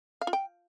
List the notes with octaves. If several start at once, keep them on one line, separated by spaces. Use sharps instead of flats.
F5
F4
G5